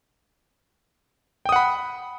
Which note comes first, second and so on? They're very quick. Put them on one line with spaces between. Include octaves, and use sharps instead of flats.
G5 D#6 F#5 B5